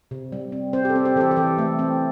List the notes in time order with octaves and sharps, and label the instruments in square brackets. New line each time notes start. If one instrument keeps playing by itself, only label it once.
[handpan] C3
G3
C4
C4 C5
G4
A4
C4
G4
E3 A4
G4
G4
E3 A4
A3
C4